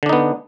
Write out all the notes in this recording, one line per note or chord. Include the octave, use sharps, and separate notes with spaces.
D3 B3 D4 D#4